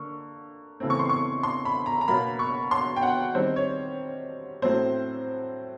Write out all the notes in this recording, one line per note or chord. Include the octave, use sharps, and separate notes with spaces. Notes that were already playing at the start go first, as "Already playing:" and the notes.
Already playing: D3 A#3 C#6
C#3 E3 A3 C4
C#6
C6
C#6
C6
B5
A#5
A#5
B2 F#3 A#3 B5
C#6
C6
G5
F#5
D#3 G3 C4 C5
C#5
A2 F#3 A3 C4 C5